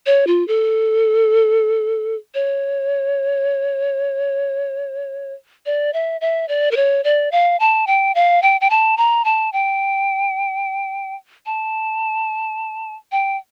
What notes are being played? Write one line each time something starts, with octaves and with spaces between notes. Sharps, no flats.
C#5
F4
A4
C#5
D5
E5
E5
D5
A#4
C#5
D5
F5
A5
G5
F5
G5
G5
A5
A#5
A5
G5
A5
G5